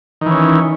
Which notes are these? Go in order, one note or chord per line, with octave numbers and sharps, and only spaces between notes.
D#3 E3 C#4